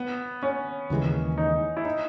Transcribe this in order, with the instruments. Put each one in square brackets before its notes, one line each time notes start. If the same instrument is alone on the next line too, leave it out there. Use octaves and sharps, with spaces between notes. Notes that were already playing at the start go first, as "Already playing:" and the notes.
Already playing: [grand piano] B3
C#4
[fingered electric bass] D#2 C#3 E3 G#3
[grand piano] D#4
E4
D#4